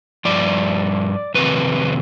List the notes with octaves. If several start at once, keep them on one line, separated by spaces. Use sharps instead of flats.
G2 F3 D5
F2 C3 D#3 B4